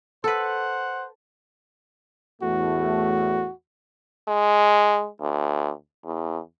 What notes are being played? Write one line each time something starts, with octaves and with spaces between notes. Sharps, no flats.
A4 B4 C5 F#5
E2 A2 A3 F#4
G#3
D2
E2